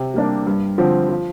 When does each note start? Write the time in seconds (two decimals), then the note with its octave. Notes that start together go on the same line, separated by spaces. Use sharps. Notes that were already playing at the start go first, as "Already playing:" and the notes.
Already playing: C3
0.14 G3 A#3 D4
0.47 G2
0.78 D3 F3 C4
1.09 F3